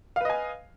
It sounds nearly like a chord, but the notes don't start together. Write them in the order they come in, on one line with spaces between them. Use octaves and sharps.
F5 B4 D#5 G#5